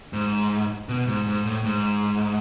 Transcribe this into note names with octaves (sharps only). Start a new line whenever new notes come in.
G#2
B2
G#2
G#2
A2
G#2